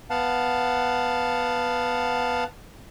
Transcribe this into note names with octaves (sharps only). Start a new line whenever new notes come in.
B3 F5 F#5 A5